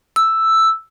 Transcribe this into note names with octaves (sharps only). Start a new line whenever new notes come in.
E6